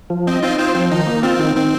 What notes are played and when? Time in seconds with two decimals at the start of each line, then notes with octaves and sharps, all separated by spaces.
0.10 F3
0.27 C4 D#5
0.42 C4 D#4 F4
0.59 C4 F4 C5
0.75 F3 C4
0.91 D#3 D#4
1.07 A#3
1.23 C4 F4
1.39 D#3
1.56 D#3 C4